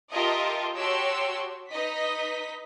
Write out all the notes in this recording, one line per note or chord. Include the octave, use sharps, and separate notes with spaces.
F4 G4 A4 A#4 D#5 E5
F#4 G4 C#5 A5 C6 E6
D#4 B4 D#5 B6